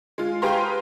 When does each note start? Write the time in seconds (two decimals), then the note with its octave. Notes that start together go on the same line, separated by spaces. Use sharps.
0.18 G#3 F4
0.42 G4 G#4 B4 F5 A#5 C6